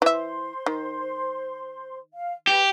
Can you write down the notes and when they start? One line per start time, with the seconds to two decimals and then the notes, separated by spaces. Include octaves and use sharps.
0.02 E3 C5 E5 C6
0.66 D#3
2.13 F5
2.47 G4 B4 G5